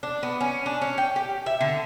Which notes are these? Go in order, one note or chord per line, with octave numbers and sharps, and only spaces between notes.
D4
B3
C#4
D4
C#4
G5
G4
E5
D3